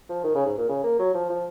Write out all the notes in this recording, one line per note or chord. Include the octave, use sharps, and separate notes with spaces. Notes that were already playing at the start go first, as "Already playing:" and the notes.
F3
D#3
C#3
G#2
A#2
C#3
A#3
F#3
F3
F3